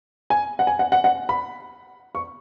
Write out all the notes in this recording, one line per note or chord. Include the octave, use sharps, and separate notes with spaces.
G#5
F#5
G#5
F#5
F#5
F#5
B5
C#6